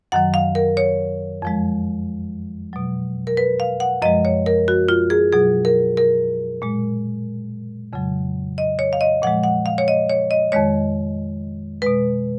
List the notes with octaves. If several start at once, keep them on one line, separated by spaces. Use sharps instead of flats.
F#2 D#3 F#3 F#5
F5
A#4
C#5
F2 F3 G#3
B2 F#3
A#4
B4
F5
F#5
F#2 F3 G#3 D#5
C#5
A#4
F#4
F4
G#4
B2 F#3 G#4
A#4
A#4
A#2 G#3
F2 C#3 F#3
D#5
C#5
F5
D#5
A#2 F3 G#3 F#5
F#5
F5
C#5
D#5
C#5
D#5
F2 D#3 G#3 C#5
B2 G#3 B4